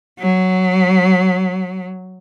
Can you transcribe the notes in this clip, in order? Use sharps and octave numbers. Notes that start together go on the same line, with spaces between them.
F#3